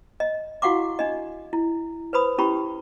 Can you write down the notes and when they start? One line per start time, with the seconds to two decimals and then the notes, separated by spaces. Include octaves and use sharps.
0.20 D#5
0.62 E4 F#4 F5 F#5 C#6 D6
0.99 D4 D#5
1.53 E4
2.13 B4 C5 B5 D#6
2.38 C#4 E4 G4 B5 C#6